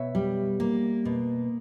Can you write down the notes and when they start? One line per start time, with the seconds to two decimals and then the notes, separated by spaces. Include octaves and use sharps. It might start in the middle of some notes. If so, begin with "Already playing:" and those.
Already playing: B2 C#5 E5
0.15 G3
0.60 A#3
1.05 B2